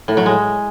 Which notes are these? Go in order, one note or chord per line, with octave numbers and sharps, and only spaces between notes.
A2
F#3
G#3